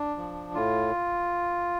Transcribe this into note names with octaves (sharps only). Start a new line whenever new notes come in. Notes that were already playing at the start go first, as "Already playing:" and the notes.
Already playing: D4
F3
A2 F4